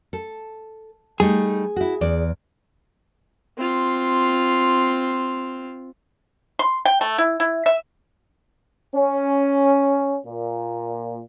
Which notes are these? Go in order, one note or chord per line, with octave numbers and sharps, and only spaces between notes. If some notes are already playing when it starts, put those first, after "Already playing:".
A4
G3 A3 D#4 G#4
E4 F#4
E2 D5
C4 F4
C6
G5
A3
E4
E4
E5
C#4
A#2